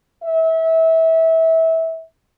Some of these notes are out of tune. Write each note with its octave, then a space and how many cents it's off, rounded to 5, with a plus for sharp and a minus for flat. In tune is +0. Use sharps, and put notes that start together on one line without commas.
E5 -25